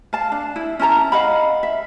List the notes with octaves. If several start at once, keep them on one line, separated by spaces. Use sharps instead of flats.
F5 A5
D4
E4
C#4 E4 A5 A#5
D#5 F5 F#5 B5
E5